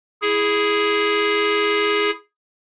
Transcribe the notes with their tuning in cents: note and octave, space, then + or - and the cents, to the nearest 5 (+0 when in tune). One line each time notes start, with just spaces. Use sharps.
E4 +0 G#4 +0